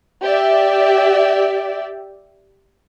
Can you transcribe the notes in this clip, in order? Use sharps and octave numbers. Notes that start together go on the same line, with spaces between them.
G4 D5 E5